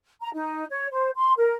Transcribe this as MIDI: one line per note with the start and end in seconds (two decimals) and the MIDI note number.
0.21 0.29 82
0.34 0.65 63
0.70 0.87 73
0.91 1.10 72
1.15 1.32 84
1.36 1.55 70